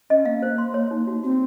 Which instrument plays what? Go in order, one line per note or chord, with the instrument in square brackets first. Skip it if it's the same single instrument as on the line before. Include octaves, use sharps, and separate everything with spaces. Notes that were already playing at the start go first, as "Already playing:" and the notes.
[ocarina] C#4 [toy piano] D#5
[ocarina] A#3 [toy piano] F5
[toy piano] C5
C6
C#5
D#4
F#4
[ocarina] C4 [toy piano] F#4